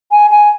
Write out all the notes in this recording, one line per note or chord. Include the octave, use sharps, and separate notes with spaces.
G#5
G#5